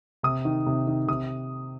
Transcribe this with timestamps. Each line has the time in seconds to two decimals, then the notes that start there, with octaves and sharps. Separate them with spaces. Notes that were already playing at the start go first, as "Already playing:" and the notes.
0.23 C3 D#6
0.45 D#3
0.66 C3
0.87 D#3
1.08 C3 D#6